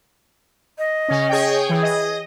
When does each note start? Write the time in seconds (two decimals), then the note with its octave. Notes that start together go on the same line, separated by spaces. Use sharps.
0.78 D#5
1.08 C#3 C#4
1.29 G#4 C#5 G5
1.69 E3 G#4
1.82 D#5